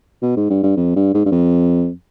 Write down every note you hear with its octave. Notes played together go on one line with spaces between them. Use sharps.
B2
G#2
G2
G2
F2
G2
G#2
G2
F2